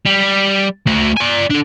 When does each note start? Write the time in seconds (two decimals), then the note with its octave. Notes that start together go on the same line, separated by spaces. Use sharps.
0.06 G3
0.87 A3 F#4
1.17 D5 G#5
1.50 D4 A4